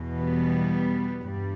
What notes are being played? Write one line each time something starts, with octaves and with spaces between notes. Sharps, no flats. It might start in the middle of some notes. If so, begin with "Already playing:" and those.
Already playing: E2 B2
G3 B3
G2 G3